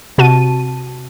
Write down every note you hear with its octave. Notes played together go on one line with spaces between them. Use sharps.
C3 F#4 A5 D#7